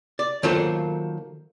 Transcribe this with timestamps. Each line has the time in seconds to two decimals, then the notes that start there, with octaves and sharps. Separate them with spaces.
0.19 D5
0.43 D#3 F#3 A#3 F4 A4 C5